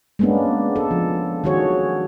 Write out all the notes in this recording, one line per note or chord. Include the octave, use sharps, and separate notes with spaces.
G#3 A#3 B3 C#4 D4
A4
F3
D#3 F#3 F#4 G#4 C#5